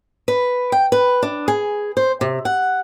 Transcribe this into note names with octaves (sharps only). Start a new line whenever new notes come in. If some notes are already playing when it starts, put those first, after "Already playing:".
B4
G5
B4
D4
G#4
C5
C3
F#5